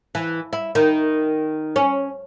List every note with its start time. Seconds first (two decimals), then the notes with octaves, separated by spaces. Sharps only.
0.15 E3
0.53 E4
0.75 D#3
1.76 C#4